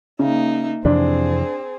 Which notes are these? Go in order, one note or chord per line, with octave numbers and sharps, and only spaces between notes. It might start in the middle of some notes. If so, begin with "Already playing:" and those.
C#3 A#3 D#4 E5
F2 C3 E3 C4 D4 G#4